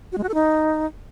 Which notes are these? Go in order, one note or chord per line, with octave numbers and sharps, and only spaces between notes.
F#4
G#3
F#4
A4
D#4